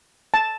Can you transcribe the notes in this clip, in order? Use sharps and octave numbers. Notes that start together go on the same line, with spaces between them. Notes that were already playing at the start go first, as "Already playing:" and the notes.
A5